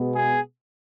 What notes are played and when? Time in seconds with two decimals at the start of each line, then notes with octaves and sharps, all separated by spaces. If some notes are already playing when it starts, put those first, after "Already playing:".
Already playing: B2 G#3 B3
0.15 G#4